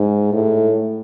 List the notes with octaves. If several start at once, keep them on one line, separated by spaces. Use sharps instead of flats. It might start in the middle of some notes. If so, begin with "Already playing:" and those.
Already playing: G#2
A2